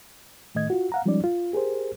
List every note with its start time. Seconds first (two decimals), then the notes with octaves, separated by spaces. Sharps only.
0.55 A2 D#3 A3 D#5 G#6
0.70 F4 F#4
0.92 F5 F#5 A#5
1.06 F3 G3 G#3 C#4 D#4 D5
1.24 F4
1.53 G4 G#4 A#4 C5